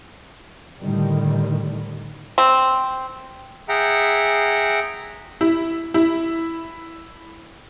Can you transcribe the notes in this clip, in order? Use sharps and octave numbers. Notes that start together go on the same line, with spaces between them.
A2 D3 D#3 G3
C4
G#4 E5 F#5 G5 A#5
E4
E4